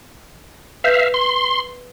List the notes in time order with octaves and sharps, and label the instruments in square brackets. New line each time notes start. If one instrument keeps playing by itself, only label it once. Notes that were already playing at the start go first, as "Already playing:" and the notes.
[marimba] B4 G6 [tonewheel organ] E5 F5
[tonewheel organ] C6